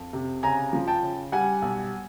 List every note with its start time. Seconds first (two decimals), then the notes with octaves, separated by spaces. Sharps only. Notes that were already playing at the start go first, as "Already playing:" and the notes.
Already playing: F2
0.13 C3
0.43 C#3 G#5 A#5
0.73 F3
0.88 G5 A5
1.03 C#3
1.32 G3 F#5 G#5
1.62 B1